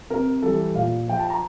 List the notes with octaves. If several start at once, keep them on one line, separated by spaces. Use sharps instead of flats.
C3 A#4
E3 G3 A4
A#2 F5
F3 G5
A5
A#5